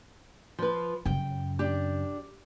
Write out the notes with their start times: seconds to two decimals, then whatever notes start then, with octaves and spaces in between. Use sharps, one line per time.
0.59 F3 B4
1.05 F#2 C#3 G5
1.59 D4 G4